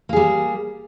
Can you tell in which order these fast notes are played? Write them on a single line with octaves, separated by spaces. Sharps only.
A#3 G#4 G3